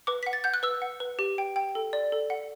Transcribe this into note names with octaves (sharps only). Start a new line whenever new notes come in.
B4 D6
F#5 B6
A6
F#5 G6
F#6
B4 E6
F#5
B4
G4
G5
G5
A4
D5
A4
F#5